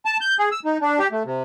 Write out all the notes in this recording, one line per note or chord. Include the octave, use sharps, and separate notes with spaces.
A5
G6
G#4
E6
D#4
D4
G4
A3
C3